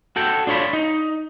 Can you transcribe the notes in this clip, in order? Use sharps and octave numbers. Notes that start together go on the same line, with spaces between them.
F#4 A4 G5
D4 F4 C#5 D5 B5
D#4